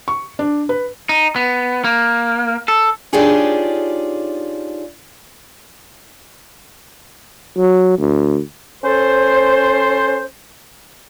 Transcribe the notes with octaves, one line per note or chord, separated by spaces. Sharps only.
C#6
D4
B4
D#4
B3
A#3
A4
D4 D#4 F4 G4 G#4 C#5
F#3
D2
C#4 A4 C5